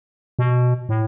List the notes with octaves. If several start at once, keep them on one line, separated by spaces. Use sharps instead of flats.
B2
A2